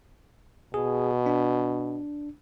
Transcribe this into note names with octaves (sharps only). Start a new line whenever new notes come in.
B2 G#4
D4